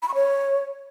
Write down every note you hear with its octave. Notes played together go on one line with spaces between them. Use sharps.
B5
C#6
C#5